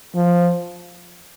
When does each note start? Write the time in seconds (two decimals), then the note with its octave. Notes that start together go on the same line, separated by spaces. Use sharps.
0.15 F3